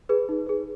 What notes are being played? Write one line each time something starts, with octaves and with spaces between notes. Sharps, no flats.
G#4 B4
D#4
G#4 B4